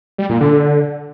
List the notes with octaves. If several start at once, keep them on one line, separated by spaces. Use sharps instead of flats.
G3
A#2
D3